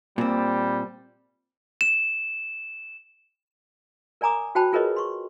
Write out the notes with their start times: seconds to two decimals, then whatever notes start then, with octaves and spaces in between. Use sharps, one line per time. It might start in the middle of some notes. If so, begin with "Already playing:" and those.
0.18 A#2 G3 C4
1.81 E7
4.21 A#4 D5 G#5 A#5 D6 D#6
4.55 F#4 C5 G5 A5 B5
4.73 F4 G#4 A#4 B4 C#5 D#5
4.96 C6 C#6